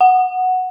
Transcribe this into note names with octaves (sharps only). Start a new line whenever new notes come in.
F#5